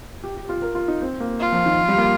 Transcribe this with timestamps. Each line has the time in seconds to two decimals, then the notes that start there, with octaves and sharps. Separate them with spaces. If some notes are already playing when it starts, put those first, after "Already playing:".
0.24 G4
0.36 G4
0.49 F4
0.62 A#4
0.75 F4
0.88 D#4
1.01 C4
1.20 A#3
1.40 F4
1.52 F3
1.66 D#3
1.79 F3
1.88 G3
1.98 A#3